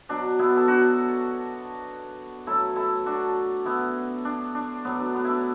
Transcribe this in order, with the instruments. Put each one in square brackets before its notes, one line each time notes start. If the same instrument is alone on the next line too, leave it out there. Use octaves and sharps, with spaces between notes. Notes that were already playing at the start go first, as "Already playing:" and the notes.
[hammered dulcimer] B2 F#3 D4
B3 E4
A4
D4 F#4
A2 F#3 E4 A4
E4 A4
D4 F#4
B3 E4
D4
D4
A2 F#3 B3
D4
B3
D4 E4